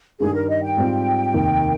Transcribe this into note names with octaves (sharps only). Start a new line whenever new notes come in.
G2 D#3 G3 G#4
A#4
D#5
G5
G#2 G3 C4 F4
F1 D#2 D#3 A#3 D#4